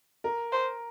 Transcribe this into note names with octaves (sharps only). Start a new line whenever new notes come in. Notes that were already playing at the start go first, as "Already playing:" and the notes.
A#4
C5